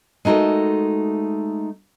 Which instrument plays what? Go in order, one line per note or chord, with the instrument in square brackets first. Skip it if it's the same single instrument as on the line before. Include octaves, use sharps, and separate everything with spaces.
[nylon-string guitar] G#3 A3 D#4 F#4 A4 A#4